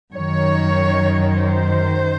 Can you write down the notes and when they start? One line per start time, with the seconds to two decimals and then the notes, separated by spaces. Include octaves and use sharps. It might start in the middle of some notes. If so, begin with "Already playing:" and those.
0.14 F#2 D#3 C#5
1.37 C5